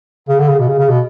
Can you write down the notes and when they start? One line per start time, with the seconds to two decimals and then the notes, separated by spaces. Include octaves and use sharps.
0.29 C#3
0.39 D3
0.48 C#3
0.59 B2
0.68 C#3
0.79 C#3
0.89 B2